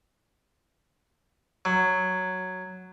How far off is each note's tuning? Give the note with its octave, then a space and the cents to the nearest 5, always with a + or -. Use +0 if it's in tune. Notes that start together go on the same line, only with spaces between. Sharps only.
F#3 +0